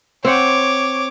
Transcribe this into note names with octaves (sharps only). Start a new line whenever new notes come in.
C4 C5 C#5 F#5 D6